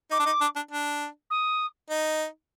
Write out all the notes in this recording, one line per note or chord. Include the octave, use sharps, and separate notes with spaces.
D#4 D6
D4
D#4
D4
D4
D4
D#6
D#4